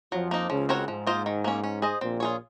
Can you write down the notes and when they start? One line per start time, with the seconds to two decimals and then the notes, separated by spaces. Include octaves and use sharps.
0.12 F2 F3 F#3
0.31 A#3 D#4
0.50 C#2 C#3 F3
0.69 C4 F#4 A#4 C#5
0.88 G#2 F3
1.07 A#3 F4 C5 D#5
1.26 D#3
1.44 A#3 C#4
1.64 C#4
1.82 G#4 C5 D#5
2.01 A#1 A#2 C4
2.20 F4 G#4 C#5